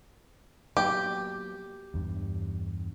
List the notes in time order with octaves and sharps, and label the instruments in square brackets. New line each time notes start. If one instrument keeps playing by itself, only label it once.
[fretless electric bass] F#3 A#3 B3 [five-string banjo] G4
[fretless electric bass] E2 G2